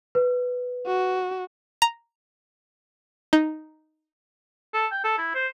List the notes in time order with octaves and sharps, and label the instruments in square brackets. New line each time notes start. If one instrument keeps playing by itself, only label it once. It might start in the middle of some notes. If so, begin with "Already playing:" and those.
[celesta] B4
[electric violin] F#4
[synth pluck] A#5
D#4
[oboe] A4
G5
A4
E4
C5